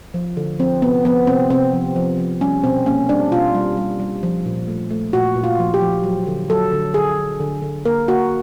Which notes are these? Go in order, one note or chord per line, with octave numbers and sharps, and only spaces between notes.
F3
D3
F3 C4
C3 B3
F3 B3
C3 C4
C3 C4
F3
F3
F3
G3 C#4
B2 C4
A#3 C#4
G3 D4
B2 F4
G3
G3
G3
F3
A#2
A3
A3
A#2 F#4
A#2
F4
F3
G4
F3
F#3
D3
F#3 A4
D3
D3 G#4
D3
D3
D3
A#3 A#4
A#3 F#4